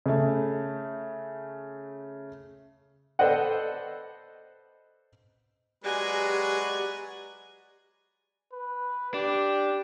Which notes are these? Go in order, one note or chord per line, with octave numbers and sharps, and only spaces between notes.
C#3 A3
A4 B4 C5 D5 D#5 F#5
F#3 G#3 F#4 G4 B4 D5 G#5 A#5
B4
D4 G4